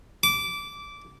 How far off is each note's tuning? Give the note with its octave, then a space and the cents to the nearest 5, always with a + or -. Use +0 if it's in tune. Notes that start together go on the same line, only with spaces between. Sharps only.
D6 -15